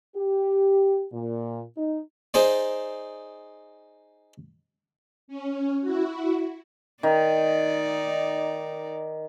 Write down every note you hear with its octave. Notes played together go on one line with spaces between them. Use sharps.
G4
A#2
D#4
D#4 G#4 C5 D5
C#4
E4 F#4
D#3 D#4 D5